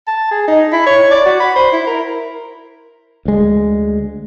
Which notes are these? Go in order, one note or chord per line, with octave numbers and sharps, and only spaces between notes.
A5
G#4
D#4
E4
C#5
D5
F#4
B5
C5
E4
A#4
D2 G#3